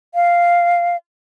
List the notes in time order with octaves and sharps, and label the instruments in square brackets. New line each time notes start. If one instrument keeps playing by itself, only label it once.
[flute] F5